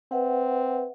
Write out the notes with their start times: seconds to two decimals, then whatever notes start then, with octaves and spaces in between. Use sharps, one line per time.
0.12 C4 B4 E5 F#5